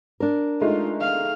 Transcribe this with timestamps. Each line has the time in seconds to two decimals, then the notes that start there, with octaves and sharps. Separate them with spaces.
0.20 D4 A#4
0.61 G#3 A3 D#4 F4
1.01 F5